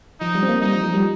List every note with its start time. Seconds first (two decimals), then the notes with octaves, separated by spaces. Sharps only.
0.21 F3 D#4
0.35 G3
0.43 C4
0.49 A#3
0.62 G3 D#4
0.73 F3
0.83 F3
0.94 G3